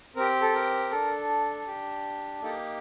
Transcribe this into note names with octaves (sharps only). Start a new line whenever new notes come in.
C4 G4 A#4
A4
A#4
D4 A4
D4 G4
A#3 D#4 G4 A4